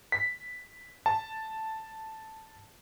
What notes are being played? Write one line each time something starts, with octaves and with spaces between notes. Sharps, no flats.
B6
A5